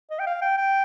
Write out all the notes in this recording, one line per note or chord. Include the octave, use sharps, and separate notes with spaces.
D#5
G5
F5
G5
G5